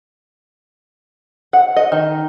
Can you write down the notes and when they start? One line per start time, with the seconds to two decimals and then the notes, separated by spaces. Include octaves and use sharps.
1.53 F#5
1.76 D#5
1.92 D#3